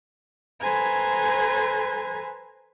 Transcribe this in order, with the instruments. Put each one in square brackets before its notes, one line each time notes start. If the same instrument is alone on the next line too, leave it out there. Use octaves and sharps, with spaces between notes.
[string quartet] A4 B4 C5 G#5 A#5 G#6